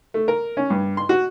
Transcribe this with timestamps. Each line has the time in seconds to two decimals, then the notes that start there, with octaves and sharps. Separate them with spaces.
0.14 A3
0.28 A#4
0.57 C#4
0.70 G2
0.97 C6
1.09 F#4